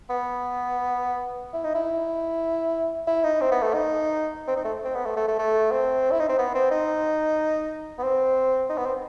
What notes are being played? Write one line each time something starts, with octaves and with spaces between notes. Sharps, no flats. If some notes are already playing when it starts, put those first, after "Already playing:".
B3
E4
D#4
E4
E4
D#4
C4
B3
A3
D#4
C4
D#4
A3
C4
B3
A3
A3
A3
A3
C4
E4
D#4
C4
B3
C4
D#4
B3
C4
D#4
B3
C4